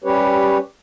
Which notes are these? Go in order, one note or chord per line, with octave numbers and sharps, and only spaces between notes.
G3 C#4 G4 B4 C#5